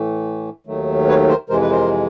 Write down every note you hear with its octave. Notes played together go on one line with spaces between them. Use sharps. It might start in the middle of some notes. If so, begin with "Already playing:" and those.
Already playing: A2 E3 A3
D#2 D#3 F#3 A3
B4 C#5
A#4 C5
F2 C3 E3 G#3 A#4 C5
B4
A#4 C5